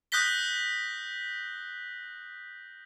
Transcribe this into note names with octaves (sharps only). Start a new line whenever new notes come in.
D#6 F#6 G6 A#6 B6 G7